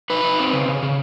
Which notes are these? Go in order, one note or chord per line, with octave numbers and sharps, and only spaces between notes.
D#4 B4
D#4
C4
C#3
C#3
C#3